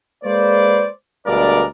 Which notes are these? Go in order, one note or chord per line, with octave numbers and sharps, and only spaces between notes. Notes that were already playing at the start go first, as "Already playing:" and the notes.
G#3 A#3 B4 C5 D5
D2 G2 B2 G#3 A#4 D5